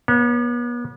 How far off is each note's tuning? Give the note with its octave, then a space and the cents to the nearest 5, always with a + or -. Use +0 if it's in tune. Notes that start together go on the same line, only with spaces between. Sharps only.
B3 -40 C#5 +0